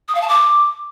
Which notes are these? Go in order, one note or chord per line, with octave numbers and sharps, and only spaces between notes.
D#6
F5
A5
D6